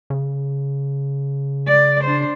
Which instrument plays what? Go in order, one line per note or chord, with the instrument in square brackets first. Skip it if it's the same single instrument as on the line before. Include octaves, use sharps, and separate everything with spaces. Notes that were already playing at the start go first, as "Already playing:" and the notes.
[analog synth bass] C#3
[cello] D5
D4 C5